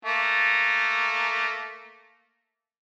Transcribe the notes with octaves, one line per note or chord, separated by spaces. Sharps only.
A3 A#3